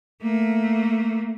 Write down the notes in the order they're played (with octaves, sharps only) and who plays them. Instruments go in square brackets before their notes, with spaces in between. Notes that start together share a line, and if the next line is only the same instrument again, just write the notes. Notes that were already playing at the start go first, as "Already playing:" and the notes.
[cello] A3 A#3